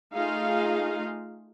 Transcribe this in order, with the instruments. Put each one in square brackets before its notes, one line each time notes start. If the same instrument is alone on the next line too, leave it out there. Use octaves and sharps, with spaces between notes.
[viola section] A3 D#4 F4 G#4 F5